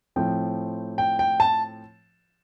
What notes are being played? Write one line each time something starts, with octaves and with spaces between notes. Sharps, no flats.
A2 F3 C4 G5
G5
G5
A5